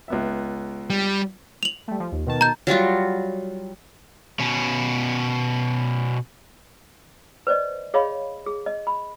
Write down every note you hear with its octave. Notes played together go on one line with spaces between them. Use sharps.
C#2 B3 E5
G3
F7 F#7
G3 A3
F3
D#2
B2 D#3 A5
A#5 G6
F#3 G3 F4 F#4
B2 C#4
B4 C5 D5 D#5
G#4 C#5 D#5 F5 B5
G#4
D#5
B5